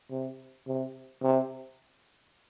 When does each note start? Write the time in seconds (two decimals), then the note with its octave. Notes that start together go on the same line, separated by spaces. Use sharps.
0.11 C3
0.67 C3
1.22 C3